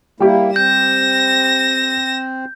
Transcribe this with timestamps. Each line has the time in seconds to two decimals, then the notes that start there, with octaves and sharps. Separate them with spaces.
0.20 G3 A#3 E4 G4
0.56 C4 G6 A#6 E7